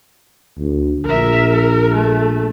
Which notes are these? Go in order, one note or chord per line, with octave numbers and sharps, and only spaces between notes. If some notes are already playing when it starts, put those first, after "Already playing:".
D2
A#1 A#4 E5
A#4
A3